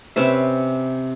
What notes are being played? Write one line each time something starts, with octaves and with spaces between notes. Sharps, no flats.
C3 C#4 B4 E5